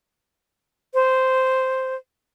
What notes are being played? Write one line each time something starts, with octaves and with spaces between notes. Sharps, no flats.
C5